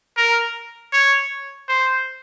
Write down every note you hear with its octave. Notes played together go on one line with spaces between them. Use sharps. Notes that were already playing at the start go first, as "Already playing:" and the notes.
A#4
C#5
C5